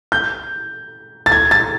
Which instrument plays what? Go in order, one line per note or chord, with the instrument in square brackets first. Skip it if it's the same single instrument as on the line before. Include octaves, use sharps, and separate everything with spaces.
[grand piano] G6
A6
G#6
A6